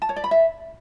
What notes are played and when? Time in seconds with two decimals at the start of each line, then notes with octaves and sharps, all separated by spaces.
0.02 A5
0.09 C#5
0.16 D5
0.24 B5
0.31 E5